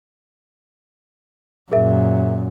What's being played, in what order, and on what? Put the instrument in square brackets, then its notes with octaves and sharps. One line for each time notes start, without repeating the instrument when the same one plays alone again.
[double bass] F#2 A#2 [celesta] G#4 A#4 E5